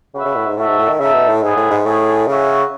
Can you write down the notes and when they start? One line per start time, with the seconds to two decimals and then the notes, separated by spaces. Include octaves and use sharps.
0.14 C#3 F#4 B4 E5
0.25 C#3
0.36 A2
0.46 G#2
0.57 A2 F#4 A4 E5
0.68 G#2
0.79 A2
0.89 D#3
1.00 C#3 D#4 A4 E5
1.14 B2
1.28 A2
1.42 G#2 G#3 B3 E4 G#4 D#5
1.56 A2
1.70 G#2
1.85 A2 A3 C#4 G#4
2.27 C#3 C#4 F#4 C#5 E5